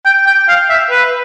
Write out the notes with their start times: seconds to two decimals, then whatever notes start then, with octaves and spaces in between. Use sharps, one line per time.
0.05 G5
0.26 G5
0.48 F5
0.69 E5
0.90 B4